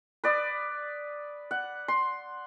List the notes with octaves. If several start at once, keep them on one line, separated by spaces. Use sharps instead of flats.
B4 D5 D#6
F#5
C6